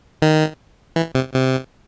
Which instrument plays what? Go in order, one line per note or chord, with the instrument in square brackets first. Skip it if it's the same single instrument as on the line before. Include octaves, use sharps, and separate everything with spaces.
[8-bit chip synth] D#3
E3
C3
C3